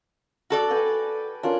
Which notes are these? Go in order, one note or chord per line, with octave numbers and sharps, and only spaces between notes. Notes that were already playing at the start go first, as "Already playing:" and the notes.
F#4 A4 D5
B4 G5 G#5
C#4 D4 F4 A#4